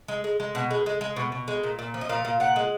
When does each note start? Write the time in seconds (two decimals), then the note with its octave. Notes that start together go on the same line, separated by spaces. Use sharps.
0.08 G#3
0.24 G#3
0.40 G#3
0.55 B2
0.71 G#3
0.86 G#3
1.01 G#3
1.16 B2
1.32 B2
1.48 G#3
1.63 A#2
1.79 A#2
1.94 F3
2.01 D#5
2.09 A#2 F5
2.25 A#2
2.40 A#2 F#5
2.56 G#3